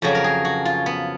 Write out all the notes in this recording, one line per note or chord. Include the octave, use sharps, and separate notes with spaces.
F2 C#3 F#3 F#4
A#4
G#4
F#4
F4
B3